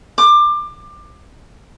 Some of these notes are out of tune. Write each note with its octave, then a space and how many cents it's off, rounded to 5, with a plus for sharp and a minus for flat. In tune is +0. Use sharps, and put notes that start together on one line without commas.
D6 +20